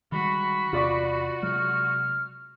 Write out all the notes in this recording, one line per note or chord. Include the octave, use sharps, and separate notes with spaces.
D#3 G3 G#3 F#4 B5
E2 C3 F4 D5 C#6
C3 F#3 G#3 F6